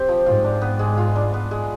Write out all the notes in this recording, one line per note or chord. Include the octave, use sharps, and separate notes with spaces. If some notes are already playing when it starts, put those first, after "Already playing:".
Already playing: C4 G4 C5
F3
G#2 F4
D4
B3
G#3
F4
D4
B3
G#3